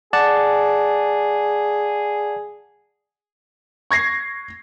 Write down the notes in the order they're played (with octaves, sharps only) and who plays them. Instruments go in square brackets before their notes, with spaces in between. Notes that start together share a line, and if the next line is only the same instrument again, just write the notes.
[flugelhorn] G#4 [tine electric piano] D5 F#5 A5
[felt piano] C#6 G#6 A#6 C7